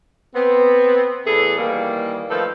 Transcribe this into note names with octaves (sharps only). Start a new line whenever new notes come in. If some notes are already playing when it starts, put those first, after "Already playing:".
B3 C4
E2 A2 E3 G#4 A4
D#3 E3 G3 A#3
D#3 F3 A3 A4 B4 F5